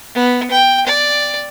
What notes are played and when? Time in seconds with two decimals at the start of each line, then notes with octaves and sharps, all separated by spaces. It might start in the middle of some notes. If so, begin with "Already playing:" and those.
0.15 B3
0.51 G5
0.87 D5